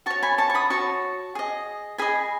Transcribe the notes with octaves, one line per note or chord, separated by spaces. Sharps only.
F#4 C#5 A5 C#6
G#5 B5
A5 C#6
C#6
B5 D#6
F#4 C#5 A5 C#6
G#4 D#5
G#4 D#5 G#5 B5